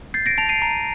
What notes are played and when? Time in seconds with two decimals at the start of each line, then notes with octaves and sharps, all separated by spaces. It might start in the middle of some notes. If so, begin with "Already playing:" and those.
0.14 G6 A6 C7
0.26 A#6 D7
0.38 A5 D7 F7
0.49 C7 D#7
0.62 A#5